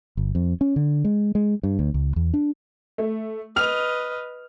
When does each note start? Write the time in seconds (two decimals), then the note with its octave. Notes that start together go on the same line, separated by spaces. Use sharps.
0.17 G1
0.35 F2
0.61 C#4
0.76 D3
1.04 G#3
1.35 G#3
1.63 G2
1.79 D2
1.94 C#2
2.16 E2
2.34 D4
2.98 A3
3.56 B4 D#5 F6 F7